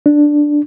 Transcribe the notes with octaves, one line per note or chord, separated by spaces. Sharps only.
D4